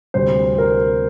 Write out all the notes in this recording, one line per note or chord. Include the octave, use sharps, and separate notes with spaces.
D2 C3 G3 C5
A#4